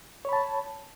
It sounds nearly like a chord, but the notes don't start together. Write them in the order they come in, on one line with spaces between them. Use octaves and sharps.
C#5 B5 A5